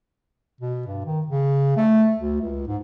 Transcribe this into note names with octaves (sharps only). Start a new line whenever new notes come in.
B2
G2
D#3
C#3
A3
D2
C#2
G#2